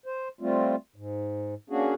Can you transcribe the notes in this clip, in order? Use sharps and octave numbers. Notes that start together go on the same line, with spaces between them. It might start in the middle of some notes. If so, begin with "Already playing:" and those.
C5
G3 A3 C4 F4
G#2
A#3 C#4 D4 F#4 G#4